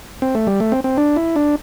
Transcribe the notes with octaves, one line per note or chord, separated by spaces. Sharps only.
C4
A3
G3
A3
C4
C4
D4
E4
D4